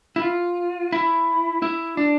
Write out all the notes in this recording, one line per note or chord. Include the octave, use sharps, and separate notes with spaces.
E4
F4
E4
E4
D4